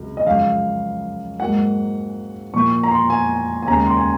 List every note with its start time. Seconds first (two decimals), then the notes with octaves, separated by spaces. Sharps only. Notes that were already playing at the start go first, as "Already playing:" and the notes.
Already playing: C#2 C3 F#3
0.17 D#5
0.26 F#2 C#3 F3 G#3 F5
1.40 G#2 F#3 A#3 F#5
2.54 A#2 F3 A#3 C#6
2.83 A#5
2.91 C6
3.10 G#5
3.63 G#5
3.67 D#2 C#3 G#3 A#5
3.87 C6
3.97 G#5